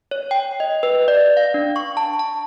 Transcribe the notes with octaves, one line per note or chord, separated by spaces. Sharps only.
C#5
G5
D#5
B4
D5
F5
D4
C#6
A5
A5